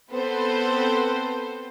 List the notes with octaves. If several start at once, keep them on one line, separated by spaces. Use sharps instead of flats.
B3 C4 A4 B4 C5